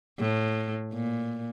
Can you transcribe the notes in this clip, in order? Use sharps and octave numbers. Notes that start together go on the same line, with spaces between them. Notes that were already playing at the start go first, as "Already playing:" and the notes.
A2
A#2